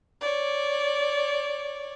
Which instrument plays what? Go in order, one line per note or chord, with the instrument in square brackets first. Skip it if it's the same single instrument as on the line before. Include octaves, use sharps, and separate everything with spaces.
[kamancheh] C#5 D5